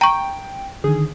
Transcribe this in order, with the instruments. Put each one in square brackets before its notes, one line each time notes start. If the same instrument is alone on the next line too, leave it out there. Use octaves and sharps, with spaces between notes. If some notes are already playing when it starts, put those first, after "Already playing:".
[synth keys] G5 [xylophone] A#5 C#6
[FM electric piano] D3 D#3 [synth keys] G#4